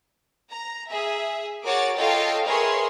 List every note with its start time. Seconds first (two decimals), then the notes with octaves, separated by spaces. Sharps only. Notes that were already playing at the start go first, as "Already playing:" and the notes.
0.51 A#5
0.91 G#4 E5
1.65 F#4 G#4 A#4 C#5 D6 A6
1.96 F4 A4 C#5 D#5 F5 G5
2.46 G#4 A#4 B4 C#5 E5 C6